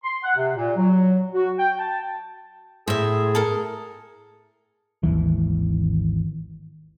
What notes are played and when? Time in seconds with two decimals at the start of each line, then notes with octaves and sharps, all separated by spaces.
0.04 C6
0.23 F#5
0.36 C3
0.56 A#2
0.77 F#3
1.34 F#4
1.58 G5
1.79 A5
2.88 A2 G#4 C5 E5
3.35 A4 A#4
5.03 G#1 D#2 E3